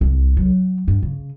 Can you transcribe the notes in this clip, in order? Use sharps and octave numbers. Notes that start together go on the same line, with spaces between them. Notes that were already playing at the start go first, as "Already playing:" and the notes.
C2
F#3
G2
C#3